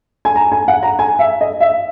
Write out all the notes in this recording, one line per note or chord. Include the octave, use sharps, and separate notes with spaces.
G#5
A#5
G#5
F#5
A#5
G#5
E5
D#5
E5